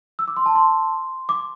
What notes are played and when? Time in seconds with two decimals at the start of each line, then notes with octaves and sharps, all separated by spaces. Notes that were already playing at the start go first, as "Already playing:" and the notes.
0.19 E6
0.28 D6
0.37 C6
0.46 A5
0.55 C6
1.29 D6